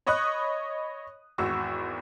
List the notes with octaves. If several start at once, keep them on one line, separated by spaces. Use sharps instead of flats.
C#5 D#5 B5 C#6 D#6 F#6
G#1 E2 F#4 C#6 E6